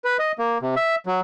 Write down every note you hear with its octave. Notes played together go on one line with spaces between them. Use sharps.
B4
D#5
A#3
C3
E5
F#3